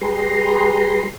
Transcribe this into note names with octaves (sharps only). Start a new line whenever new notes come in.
G3 G4 G#4 B4 A#5 C6